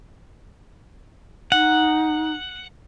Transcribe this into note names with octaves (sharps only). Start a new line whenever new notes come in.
D#4 F#5